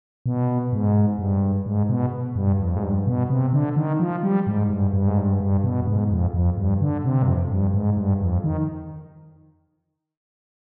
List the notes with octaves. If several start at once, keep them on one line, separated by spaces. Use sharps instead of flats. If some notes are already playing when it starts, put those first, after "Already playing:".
B2
G#2
G2
G#2
B2
G2
F2
G#2
G2
B2
C3
D3
D#3
F3
G3
G#2
G2
G2
G#2
G2
G2
B2
G2
G#2
F2
F2
G2
D3
C3
G2
F2
G2
G#2
G2
F2
D#3